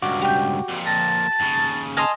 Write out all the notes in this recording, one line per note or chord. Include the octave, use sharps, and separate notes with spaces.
C#2 G2 F#4 D6
G4 G6
F2 A#2
A5 A#6
D#2 C#3
A4 D#5 G#5 C6 F6